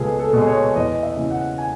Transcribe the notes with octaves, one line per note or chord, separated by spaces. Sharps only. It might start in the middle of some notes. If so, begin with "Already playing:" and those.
Already playing: C#2 B2 G#3 G#4 A4 B4
A4
B2 G#3
C#5
E2 D#5
E5
C#3 E3
F#5
G#5